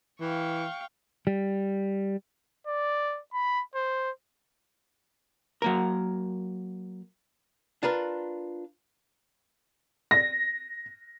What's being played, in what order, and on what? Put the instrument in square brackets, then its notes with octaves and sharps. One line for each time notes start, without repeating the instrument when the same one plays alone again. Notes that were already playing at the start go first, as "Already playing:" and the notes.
[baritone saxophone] E3 [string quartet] F5 G5 C#6
[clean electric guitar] G3
[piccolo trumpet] D5
B5
C5
[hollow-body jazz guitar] F#3 A#3 A#4
D4 F4 A#4 B4
[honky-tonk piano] A#6